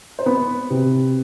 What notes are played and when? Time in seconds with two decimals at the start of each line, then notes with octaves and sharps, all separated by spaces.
0.19 C5
0.26 B3 B4
0.70 C3